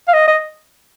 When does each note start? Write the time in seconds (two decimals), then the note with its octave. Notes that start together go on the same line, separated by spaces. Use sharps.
0.08 F5
0.13 D#5
0.28 D#5